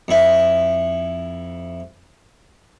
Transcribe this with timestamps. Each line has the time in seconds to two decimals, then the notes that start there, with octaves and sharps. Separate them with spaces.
0.08 F2 E4